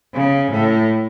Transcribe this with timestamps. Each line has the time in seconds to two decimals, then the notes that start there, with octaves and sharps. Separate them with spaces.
0.15 C#3
0.51 A2